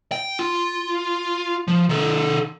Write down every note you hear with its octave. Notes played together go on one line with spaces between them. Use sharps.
G5
F4
F3
D#3 A4